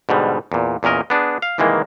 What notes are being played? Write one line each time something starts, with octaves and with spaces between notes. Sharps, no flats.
G#2 B2 D3 G3
E2 A#2
E2 A#2 C#4 A#4 D#5
B3 D4 G#4
F5
C2 D#3 E3 G#3 A#3